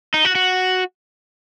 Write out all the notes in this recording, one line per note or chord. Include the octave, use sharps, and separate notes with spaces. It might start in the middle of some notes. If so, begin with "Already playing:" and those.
D#4
F#4
F#4